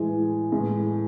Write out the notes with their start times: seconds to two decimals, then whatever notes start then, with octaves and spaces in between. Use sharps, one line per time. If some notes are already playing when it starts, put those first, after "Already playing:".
Already playing: A2 E3 G#3 G#5
0.52 A2 E3 G#3